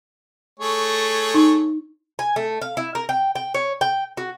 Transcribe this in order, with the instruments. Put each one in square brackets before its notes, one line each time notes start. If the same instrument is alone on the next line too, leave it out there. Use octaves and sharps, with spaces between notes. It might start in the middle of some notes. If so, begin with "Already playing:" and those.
[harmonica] A3 G#4 C#5
[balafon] D#4
[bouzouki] G#5
A3
F5
E4
A#4
G5
G5
C#5
G5
F#4